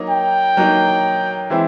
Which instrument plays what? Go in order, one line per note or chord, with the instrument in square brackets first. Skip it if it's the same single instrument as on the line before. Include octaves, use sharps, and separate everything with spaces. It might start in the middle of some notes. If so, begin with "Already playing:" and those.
Already playing: [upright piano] F#3 A#3 D#4
[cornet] G5
[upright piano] F#3 A#3 D#4
E3 G#3 C4 E4